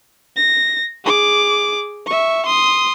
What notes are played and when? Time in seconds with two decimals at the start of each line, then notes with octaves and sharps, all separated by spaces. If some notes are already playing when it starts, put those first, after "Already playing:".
0.36 A#6
1.05 G#4 D6
2.07 E5 C#6
2.46 C6 D#6